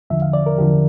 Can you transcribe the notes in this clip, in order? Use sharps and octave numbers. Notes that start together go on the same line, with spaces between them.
E2 D3 F3 E5
F5
D5
A#4
E2 D3 F3 G4